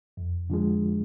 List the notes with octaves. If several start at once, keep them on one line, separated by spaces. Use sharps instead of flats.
F2
D3 F3 G#3